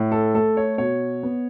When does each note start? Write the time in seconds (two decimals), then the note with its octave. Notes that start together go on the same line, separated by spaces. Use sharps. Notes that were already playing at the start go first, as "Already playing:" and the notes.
Already playing: A2
0.12 A4
0.34 A3 A4
0.57 C#5
0.78 B2 C#5
1.23 B3